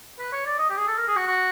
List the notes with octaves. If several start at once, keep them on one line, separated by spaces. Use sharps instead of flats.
B4
C#5
D5
D#5
G4
G#4
A4
A#4
G#4
F#4
F#4